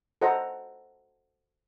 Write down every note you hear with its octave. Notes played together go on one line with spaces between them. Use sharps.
A4 C5 D#5 F#5 A#5